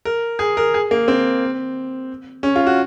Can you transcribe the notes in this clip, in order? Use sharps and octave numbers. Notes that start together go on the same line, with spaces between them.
A#4
G#4
A#4
G#4
A#3
C4
C#4
F4
F#4